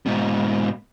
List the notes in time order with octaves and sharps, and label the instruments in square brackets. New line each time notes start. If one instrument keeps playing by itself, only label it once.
[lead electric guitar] G#2 B2